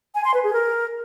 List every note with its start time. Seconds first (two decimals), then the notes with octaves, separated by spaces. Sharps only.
0.15 G#5
0.24 C6
0.34 B4
0.44 G#4
0.53 A#4